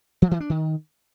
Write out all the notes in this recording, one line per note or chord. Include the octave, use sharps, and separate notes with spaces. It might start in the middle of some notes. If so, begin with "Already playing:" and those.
F3
E3
D4
D#3